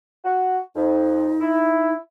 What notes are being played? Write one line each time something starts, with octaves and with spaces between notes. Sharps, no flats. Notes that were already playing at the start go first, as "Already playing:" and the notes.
F#4
F2 D#4
E4